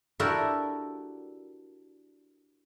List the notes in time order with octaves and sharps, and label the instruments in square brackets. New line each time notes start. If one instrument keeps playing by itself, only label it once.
[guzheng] D4 E4 F#4 G4 A4 A#4